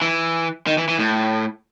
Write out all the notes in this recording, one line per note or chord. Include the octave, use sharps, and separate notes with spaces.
E3
D#3
E3
E3
A2